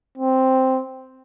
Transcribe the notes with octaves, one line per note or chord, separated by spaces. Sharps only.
C4